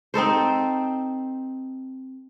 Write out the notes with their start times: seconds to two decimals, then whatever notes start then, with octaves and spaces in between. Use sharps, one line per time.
0.14 C4 D#4 A4 C5